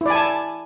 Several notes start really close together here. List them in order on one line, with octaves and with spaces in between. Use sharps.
E4 D5 G#5 A5